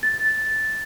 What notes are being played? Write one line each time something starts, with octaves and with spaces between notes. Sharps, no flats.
A6